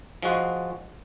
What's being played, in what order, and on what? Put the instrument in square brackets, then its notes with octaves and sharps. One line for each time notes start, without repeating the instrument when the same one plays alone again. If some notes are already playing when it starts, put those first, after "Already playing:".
[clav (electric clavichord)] F3 G#3 F#4